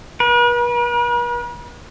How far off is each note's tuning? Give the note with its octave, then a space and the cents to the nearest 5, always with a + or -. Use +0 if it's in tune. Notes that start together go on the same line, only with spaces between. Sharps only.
B4 -45